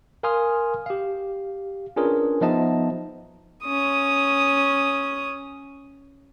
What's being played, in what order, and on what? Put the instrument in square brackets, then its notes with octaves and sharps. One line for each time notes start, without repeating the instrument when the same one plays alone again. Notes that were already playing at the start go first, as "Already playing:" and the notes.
[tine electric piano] A#4 F5 G#5 C6 D#6 F6
G4 F5
C#4 D4 F4 G#4 A#4 B4
F3 B3 D#4 D#5 E5 A5
[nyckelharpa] C#4 D#6